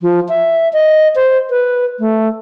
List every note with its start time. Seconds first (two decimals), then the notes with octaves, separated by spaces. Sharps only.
0.02 F3
0.29 E5
0.73 D#5
1.15 C5
1.50 B4
1.99 A3